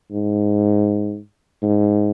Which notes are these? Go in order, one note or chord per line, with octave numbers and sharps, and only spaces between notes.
G#2
G#2